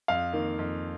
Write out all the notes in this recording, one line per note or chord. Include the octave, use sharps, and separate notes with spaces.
F2 F5
D#3 A#3
F2